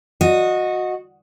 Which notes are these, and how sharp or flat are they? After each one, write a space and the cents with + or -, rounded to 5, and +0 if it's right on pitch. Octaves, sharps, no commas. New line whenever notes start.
F#4 -20 D#5 +0